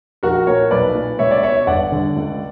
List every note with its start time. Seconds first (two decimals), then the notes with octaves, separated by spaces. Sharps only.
0.23 A#1 F#4 A#4
0.47 A#2 A#4 C#5
0.71 B1 B4 D5
0.95 A#2
1.19 C#2 C#5 E5
1.31 D5
1.43 B2 C#5 E5
1.55 E5
1.67 G1 D5 F#5
1.92 G2 D3
2.16 C#2